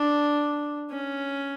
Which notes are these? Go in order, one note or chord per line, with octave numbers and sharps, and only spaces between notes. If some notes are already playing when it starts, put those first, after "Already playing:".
Already playing: D4
C#4